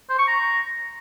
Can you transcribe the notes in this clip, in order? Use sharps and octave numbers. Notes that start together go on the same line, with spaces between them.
C5
C#6
A#5